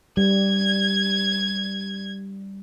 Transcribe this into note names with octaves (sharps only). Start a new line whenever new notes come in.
G3 G#6